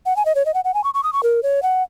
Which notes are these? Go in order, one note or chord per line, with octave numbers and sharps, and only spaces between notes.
F#5
G#5
D#5
C#5
D#5
F#5
F#5
G#5
C#6
C#6
D#6
C#6
A#4
C#5
F#5